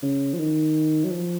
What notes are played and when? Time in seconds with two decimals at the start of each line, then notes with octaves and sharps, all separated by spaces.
0.03 C#3
0.33 F3
0.39 D#3
1.04 F#3
1.12 F3